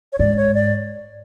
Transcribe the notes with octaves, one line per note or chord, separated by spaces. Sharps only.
C#5
G#2 D5
C#5
D5